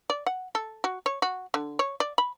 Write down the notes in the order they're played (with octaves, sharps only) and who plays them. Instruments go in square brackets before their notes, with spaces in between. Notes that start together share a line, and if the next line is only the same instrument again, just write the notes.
[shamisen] D5
F#5
A4
F#4
C#5
F#4
D3
C#5
D5
B5